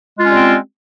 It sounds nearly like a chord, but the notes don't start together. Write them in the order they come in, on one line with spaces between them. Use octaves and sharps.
G#3 F4 C#4 G3 C4